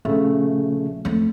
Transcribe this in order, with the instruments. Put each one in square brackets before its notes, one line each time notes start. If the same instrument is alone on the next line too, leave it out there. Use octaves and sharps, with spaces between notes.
[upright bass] A#1 [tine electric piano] C#3 A3
[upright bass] F2 A3